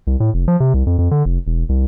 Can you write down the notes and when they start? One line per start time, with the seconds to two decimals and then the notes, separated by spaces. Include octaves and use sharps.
0.07 C2
0.20 A2
0.34 F1
0.48 F3
0.60 C3
0.74 C2
0.87 F2
0.98 F2
1.11 D3
1.25 F1
1.47 E1
1.69 C2